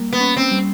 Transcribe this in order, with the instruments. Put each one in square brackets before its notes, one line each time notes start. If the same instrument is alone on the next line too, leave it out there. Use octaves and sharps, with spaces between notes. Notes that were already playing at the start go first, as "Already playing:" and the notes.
Already playing: [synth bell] G3 A#3
[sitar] B3
[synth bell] C#4
[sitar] C4
[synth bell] G3